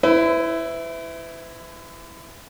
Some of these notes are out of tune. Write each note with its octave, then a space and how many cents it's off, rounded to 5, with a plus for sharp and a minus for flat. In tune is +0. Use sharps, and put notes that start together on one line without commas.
E4 +0 B4 +40